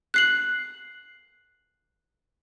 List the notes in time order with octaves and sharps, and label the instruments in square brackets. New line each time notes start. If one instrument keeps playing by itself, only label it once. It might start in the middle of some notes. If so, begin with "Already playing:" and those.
[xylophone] F#6 C7 F#7